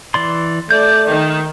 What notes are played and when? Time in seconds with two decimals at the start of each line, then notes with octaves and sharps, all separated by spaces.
0.14 E3 D5 C6
0.71 A3 D5 G6
1.06 D#3